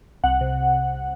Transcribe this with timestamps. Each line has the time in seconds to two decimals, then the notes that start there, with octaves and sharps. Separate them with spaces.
0.24 C2 F#5
0.41 C3